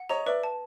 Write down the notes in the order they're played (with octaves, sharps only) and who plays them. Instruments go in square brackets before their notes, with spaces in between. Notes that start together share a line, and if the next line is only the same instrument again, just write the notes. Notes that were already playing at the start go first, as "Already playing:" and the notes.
Already playing: [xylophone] F#5
[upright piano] C#5 D#5 [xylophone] A#5
[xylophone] B4 [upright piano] D5 E5
[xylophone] A5